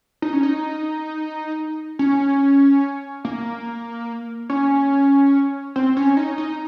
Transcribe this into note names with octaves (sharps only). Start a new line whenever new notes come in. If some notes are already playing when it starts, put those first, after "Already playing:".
D#4
C#4
D#4
C#4
A#3
C#4
C4
C#4
D#4
D#4